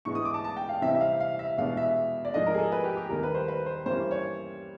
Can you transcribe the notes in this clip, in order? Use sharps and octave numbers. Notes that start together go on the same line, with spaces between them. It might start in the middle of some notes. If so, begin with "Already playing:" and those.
G#2 E3 G#3 B3 D4 C#6
D#6
D6
A5
A5
G5
F5
C3 E3 G3 C4 D#4 E5
E5
F5
F5
E5
E2 B2 G#3 B3 D4 F5
E5
D5
G#2 F3 A3 D4 D#5
A#4
G#4
A4
B4
G4
G4
D#2 D#3 G3 A#4
B4
C5
B4
C5
G2 E3 G3 A#3 C#4 C5
C#5